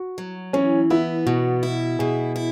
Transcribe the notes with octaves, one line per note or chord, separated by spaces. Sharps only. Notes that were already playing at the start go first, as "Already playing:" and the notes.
Already playing: F#4
F#3
E3 C#4
B3 E4
B2 F#4
E4
B2 G#4
E4